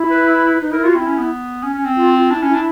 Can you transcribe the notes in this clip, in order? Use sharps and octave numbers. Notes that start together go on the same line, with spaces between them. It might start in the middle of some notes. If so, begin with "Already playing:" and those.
Already playing: E4
B4
D#4 B4
E4 A#4
F4 F#4
C4 E4
C#4
B3
C#4
C#4
C4
F4
F4
D4 E4
C#4 E4
D4 E4